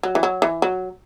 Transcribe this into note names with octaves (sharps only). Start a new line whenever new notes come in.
F#3
E3
F#3
E3
F#3